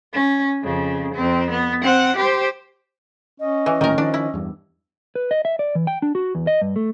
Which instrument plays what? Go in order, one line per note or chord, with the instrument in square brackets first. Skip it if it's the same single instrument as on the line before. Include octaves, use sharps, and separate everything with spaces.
[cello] C#4
F2 C#3
F2 C4
B3
C4 F#5
G4 C5
[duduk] C#4 [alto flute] D#5
[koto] E3
[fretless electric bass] D1 A1 A#2 [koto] D#3 A#4
[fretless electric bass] D#3 F3 [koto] D4
[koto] E4
[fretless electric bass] E2 G2
[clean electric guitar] B4
D#5
E5
D5
E3
G5
D4
F#4
E2
D#5
G2
A3